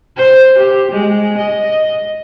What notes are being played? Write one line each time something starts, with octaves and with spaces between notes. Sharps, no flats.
C5
G4
G#3
D#5